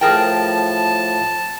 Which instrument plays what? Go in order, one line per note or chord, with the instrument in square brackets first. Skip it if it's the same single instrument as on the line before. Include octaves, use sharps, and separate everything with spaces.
[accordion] A2 F3 [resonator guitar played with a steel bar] G#4 A#4 G5 [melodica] A5